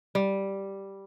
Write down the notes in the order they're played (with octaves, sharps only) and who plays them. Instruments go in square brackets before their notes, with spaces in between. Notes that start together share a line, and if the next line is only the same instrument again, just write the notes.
[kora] G3